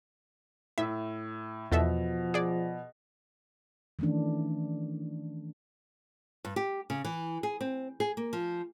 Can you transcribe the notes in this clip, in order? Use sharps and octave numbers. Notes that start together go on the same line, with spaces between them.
A2 E5
E2 B2 F3 A4 E5
G#4 D5
D#3 E3 A3 C#4 D4
G2
G4
C#3
E3
G#4
C4
G#4
A#3
F3